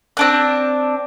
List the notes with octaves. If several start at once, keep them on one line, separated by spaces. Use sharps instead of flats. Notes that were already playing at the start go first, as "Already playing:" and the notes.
C4 D4 F#6